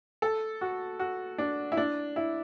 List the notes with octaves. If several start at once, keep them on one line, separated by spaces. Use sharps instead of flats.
A4
F#4
F#4
D4
E4
D4
E4